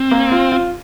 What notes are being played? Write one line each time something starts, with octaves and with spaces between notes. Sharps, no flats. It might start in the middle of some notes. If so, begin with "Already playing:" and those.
Already playing: C4
A#3
F4
F4